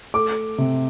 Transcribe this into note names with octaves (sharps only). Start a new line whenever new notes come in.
A3 D6
C3